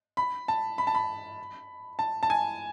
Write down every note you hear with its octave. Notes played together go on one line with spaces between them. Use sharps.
B5
A5
B5
A5
B5
A5
A5
G#5